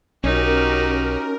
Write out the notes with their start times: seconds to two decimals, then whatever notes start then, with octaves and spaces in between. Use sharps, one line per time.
0.24 B1 C#4 D#4 F#4 G4 A#4